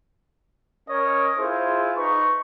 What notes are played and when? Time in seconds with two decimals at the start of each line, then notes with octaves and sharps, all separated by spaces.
0.89 C#4 A#4 C#5 D#5
1.38 E4 F4 G#4 C5
1.96 D#4 B4 C#6